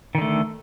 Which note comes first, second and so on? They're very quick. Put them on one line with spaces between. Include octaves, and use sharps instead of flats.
D#3 D3 A3